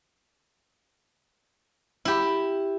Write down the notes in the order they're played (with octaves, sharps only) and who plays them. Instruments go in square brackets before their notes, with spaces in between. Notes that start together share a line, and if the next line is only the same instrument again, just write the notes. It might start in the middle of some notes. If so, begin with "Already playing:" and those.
[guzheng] E4 G4